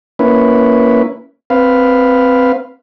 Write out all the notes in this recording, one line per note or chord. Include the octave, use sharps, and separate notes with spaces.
A#3 C#4 E4 B4
C4 B4 F5